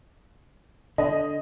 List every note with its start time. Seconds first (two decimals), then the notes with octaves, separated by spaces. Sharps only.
0.98 D3 D#5